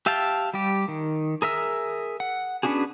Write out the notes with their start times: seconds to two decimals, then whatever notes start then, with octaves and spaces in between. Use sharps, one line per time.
0.06 G4 E5 F5 G5 A5
0.54 G3 G4
0.88 D#3
1.42 G#4 A#4 E5 E6
2.20 F#5
2.63 B3 C#4 D4 F#4 G#4